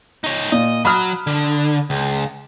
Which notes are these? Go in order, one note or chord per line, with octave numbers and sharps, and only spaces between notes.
D#4 C#5
A#2 D#5
F#3 B5 D#6 F6
D3
C#2